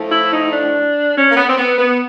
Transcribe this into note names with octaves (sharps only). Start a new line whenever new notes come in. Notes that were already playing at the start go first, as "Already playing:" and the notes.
Already playing: A2 F3 A3
E4
D#4
D4
C#4
A#3
B3
C4
B3
B3